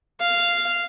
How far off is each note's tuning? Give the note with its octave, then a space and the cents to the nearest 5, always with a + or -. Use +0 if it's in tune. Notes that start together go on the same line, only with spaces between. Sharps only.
F5 -10